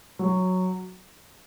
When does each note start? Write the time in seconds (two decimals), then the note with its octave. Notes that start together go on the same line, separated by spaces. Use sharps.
0.19 F#3